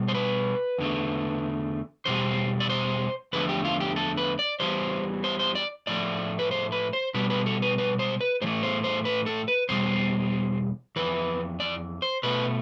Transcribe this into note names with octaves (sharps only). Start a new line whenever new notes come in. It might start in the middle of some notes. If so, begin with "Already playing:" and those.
Already playing: B2 G3
C5
B4
E2 D3 A3
E2 B2 G3 C5
D5
C5
E2 D3 F3 A3 B4
G4
F4
G4
A4
B4
D5
E2 C3 E3 G3 C5
C5
C5
D5
A2 F3 A3 D5
B4
C5
B4
C5
B2 G3 B4
B4
A4
B4
B4
C5
B4
A2 E3 A3 C5
C5
C5
B4
A4
B4
E2 B2 G3 C5
F2 C3 E3 B4
D5
C5
B2 A3 B4